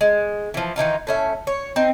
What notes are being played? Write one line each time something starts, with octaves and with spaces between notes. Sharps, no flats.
G#3
E3 F3
D#3 E3 D#4 F4
A2 C#4 E5
C#5
C4 D#4